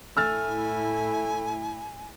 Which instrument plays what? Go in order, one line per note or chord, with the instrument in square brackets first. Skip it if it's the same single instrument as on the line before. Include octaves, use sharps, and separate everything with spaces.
[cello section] A2 E4 [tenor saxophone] A3 [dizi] G#5 [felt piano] E6 F6 A6